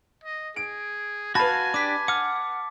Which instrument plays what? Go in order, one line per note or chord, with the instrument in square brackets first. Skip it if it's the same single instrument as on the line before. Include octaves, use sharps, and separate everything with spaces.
[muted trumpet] D#5
[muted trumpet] G#4 [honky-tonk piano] D7
[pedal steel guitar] F#4 F5 [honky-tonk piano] B4 B5 [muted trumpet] G#5 [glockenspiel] A5 A6
[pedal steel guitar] D4 G4 [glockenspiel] D6 B6
[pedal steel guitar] F#5 F6 [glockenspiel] D6